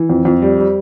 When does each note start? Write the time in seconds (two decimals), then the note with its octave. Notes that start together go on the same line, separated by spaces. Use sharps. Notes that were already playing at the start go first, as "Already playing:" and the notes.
Already playing: E3
0.10 F2
0.25 F2
0.42 G3
0.59 G3